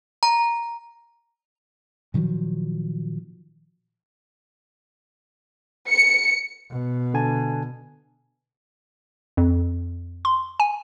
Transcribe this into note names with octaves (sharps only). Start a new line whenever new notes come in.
A#5
A#2 D#3 F3 F#3
C#7
B2
D3 G#5 A5
F2
C6
G#5